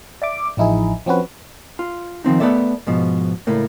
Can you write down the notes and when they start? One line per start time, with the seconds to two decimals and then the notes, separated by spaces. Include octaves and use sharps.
0.22 D5 E5 D6
0.57 A1 F3 D#4 E4 G#4
1.06 F3 C4 C#4 F#4 B4
1.79 F4
2.24 D#3 F3 C4 D#4
2.40 A3 B3 D#4 A4 D5 E5
2.87 G#2 B2 F3
3.47 C#2 A2 A3 A#3